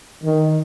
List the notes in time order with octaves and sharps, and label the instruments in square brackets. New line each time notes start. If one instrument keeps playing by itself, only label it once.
[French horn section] D#3